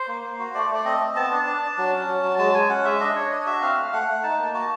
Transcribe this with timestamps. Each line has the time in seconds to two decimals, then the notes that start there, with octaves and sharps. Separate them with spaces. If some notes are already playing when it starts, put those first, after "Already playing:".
Already playing: C5
0.08 A#3
0.23 A#3
0.39 F#4
0.54 A3 D5
0.69 A3
0.75 D5
0.85 C4 D#5
1.00 C4
1.16 B3 A5
1.31 D4
1.46 D4
1.62 D4
1.78 F#3
1.92 C#4
2.08 F#3
2.23 F#3
2.38 G#3 A5
2.54 G#3 G#5
2.70 C#4 F#5
2.85 G#3 E5
3.00 D4 D#5
3.16 D4 C#5
3.31 D4 D#5
3.46 F#4 E5
3.62 C4 F5
3.77 A3
3.93 A3 F#5
4.08 A3
4.23 D#4 A5
4.38 A#3
4.54 F#4 A5